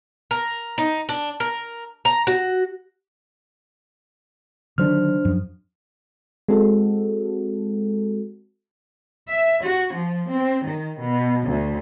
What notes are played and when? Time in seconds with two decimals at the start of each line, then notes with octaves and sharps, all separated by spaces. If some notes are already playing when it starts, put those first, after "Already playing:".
0.31 A#4
0.78 D#4
1.09 D4
1.40 A#4
2.05 A#5
2.27 F#4
4.78 D3 D#3 F#3 D4 C5 F6
5.25 F#2 F3
6.48 G#3 C4 F#4 A4
9.29 E5
9.63 F#4
9.96 F3
10.31 C4
10.66 D#3
11.00 B2
11.47 D2